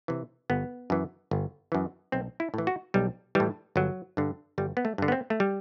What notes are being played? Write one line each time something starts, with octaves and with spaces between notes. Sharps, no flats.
C3 E3
G1 B3
F#2 E3
G1
F#2 E3
B1 C4
E4
A2 E3
F#4
B1 G3
A2 E3 G3
G1 F#3
G2 D3
G1 G3
B3
A3
G2 D3
B3
C4
A3
G3